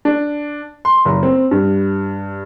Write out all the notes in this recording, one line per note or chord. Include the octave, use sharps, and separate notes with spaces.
D4
C6
F#1
C4
G2